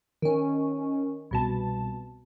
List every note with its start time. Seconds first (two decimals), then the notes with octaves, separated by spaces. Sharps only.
0.22 D#3 C#4
1.31 C2 B2 A5